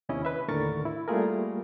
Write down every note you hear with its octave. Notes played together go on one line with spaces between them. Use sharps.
D#2 C3 C#4 E4 D#5
B4 E5
D#2 A2 D3 A#4 C#6 A6
E4
G3 A3 A#3 F4 G#4 A#4